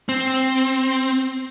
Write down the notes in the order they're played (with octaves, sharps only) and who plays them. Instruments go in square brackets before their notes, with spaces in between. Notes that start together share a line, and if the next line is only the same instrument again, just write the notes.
[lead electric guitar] C4